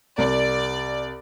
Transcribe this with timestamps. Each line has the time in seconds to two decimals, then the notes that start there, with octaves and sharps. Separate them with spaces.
0.18 C2 D5